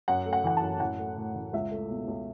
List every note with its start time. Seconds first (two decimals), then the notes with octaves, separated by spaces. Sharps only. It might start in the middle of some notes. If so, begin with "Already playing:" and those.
0.08 F#2 F#5
0.26 A3
0.33 F#5
0.44 E3 F#5
0.57 A5
0.62 F#2
0.80 A1 F#5
0.99 A3
1.17 A2
1.35 A1
1.53 C#2 E5
1.71 A3
1.90 B2
2.08 C#2